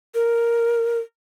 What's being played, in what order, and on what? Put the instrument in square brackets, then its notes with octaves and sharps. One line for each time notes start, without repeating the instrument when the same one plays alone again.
[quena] A#4